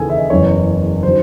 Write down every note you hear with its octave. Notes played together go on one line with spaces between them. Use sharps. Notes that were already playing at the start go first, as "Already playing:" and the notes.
Already playing: D#2 C#3 E3 G#4 A4 G#5
E5
D#5
F#1 E2 C#3 E3 C#5
D#3 F#3 C5